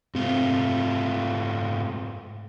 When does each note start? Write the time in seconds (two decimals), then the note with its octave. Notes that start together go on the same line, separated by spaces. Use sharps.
0.15 G#2 C3 A3 F4